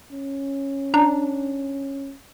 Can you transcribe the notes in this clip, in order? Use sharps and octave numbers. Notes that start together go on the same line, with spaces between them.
C#4
D4 A#5